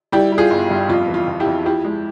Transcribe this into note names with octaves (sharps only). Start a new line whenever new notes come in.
G3 E4 G4
G3
F4 G#4
G1
G2
F2 F4
E3
F4
F2
E4 G4
F2
F3 E4 G4
G#3